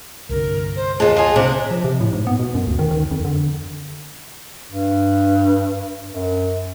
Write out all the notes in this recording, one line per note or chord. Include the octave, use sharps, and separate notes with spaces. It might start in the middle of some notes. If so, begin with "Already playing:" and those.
C2 G2 D3 A#4
C5
D#2 G#3 F4 D#5 A5
F4 G#4
C3 D4
F3
C3
A2
G#2
B3
B2
F#2
D2
D#3
D#3
F2
D3
G2
F#2